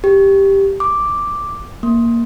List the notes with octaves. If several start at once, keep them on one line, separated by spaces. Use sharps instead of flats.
G4
D6
A#3